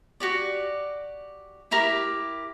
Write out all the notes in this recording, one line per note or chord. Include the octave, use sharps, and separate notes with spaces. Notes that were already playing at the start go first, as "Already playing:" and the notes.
F#4 G4 D5
E4 G4 A#4 D6